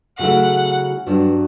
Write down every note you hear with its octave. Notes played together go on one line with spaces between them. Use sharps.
C#3 F#3 A3 E4 F#5
G2 F#3 B3 D4